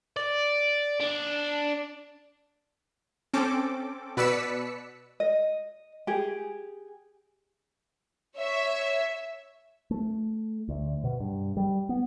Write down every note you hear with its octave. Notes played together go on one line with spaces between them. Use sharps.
D5
D4
C4 C#4 A4 D6
B2 B4 D5 E6 B6 C#7
D#5
G4 G#4
C#5 E5
A3
D2
B2
G2
G3
B3